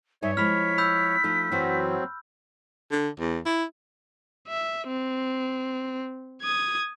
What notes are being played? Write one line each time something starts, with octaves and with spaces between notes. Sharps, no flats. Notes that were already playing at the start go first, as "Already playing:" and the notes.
G2 D#4 C#5 E5 G#5
F3 G#3 E4 B5 F6 B6
B5 E6 G6
F3 A3 D#4
F#2 E3 F#3 C4 F#4
D3
E2
E4
E5
C4
D#6 G#6